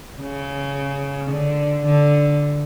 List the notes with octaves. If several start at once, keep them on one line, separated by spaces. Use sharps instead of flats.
C#3
D3
D3